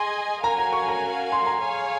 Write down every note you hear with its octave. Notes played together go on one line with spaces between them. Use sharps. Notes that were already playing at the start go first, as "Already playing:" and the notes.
Already playing: G#4 D#5 G#5 C6
C#4 F#4 A#4 F5 G#5 A#5
A#5
C#6
A#5
C6
A#5
G#4 C#5 F5 G#5